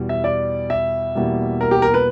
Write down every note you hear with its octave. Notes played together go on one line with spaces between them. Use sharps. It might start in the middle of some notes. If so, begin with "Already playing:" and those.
Already playing: E2 B2 G3
E5
D5
E5
E2 B2 G3 A#3
A#4
G4
A#4
B4